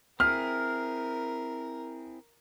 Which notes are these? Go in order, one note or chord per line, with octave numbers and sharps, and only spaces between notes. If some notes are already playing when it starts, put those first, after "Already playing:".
C4 E4 G#4 A#4 F6